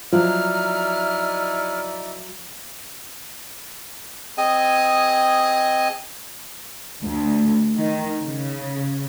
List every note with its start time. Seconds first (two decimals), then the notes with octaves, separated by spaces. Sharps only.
0.13 F3 F#3 D#4 E4 D5 F6
4.38 C4 G#4 D#5 G#5
7.04 D2
7.78 D#3
8.22 C#3